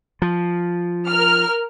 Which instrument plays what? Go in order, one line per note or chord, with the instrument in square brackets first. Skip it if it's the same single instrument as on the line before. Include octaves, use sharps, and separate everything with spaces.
[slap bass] F3
[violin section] A#4 F6